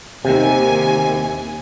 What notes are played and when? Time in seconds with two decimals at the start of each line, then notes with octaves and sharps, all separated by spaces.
0.25 D#2 C3 D#3 G#5